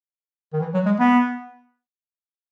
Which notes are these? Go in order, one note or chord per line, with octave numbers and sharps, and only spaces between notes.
D#3
E3
F#3
G#3
B3